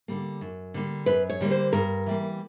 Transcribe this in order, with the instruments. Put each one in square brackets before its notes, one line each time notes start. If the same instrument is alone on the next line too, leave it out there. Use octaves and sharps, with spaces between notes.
[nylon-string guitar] D3 G3 A#3
F#2
D3 G3 A#3
F#2 B4
C#5
D3 G3 A#3
C5
G2 A#4
E3 G3 A#3